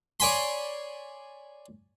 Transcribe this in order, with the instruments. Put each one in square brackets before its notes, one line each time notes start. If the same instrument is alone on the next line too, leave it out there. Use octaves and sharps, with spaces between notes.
[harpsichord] C#5 D5 G#5 B5 C6